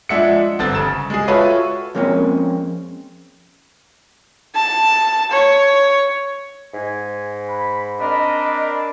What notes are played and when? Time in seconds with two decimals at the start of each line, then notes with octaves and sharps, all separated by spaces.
0.09 F3 G#3 D4 E5 F#5 C#7
0.59 G1 D3 C4 A6
0.75 C#3 E7
1.10 G#3 G#4
1.28 F4 F#4 A4 B4 C#5 E5
1.95 F2 G#3 A#3 C4 C#4
4.55 A5
5.32 C#5
6.74 G#2 G#5
7.48 B5
8.00 C4 D4 A#4 D#5 B5